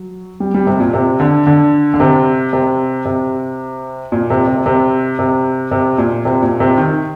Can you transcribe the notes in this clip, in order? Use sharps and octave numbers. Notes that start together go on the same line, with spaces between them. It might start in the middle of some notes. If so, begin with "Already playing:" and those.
Already playing: F#3
G3
G3
C3
A#2
C3
D3
D3
D3
C3
C3
C3
A#2
C3
C3
C3
C3
C3
A#2
C3
A#2
C3
D#3